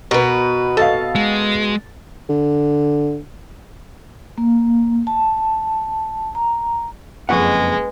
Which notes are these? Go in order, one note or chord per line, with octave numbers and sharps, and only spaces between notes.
B2 A#4 B4
A4 D#5 F5 A5
G#3
D3
A#3
A5
A#5
F#1 F2 G#3 G#4 B4 F#5 C#6